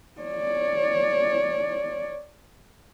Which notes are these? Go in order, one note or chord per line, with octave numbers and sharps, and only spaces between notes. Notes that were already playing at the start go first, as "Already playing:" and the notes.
C#5 D5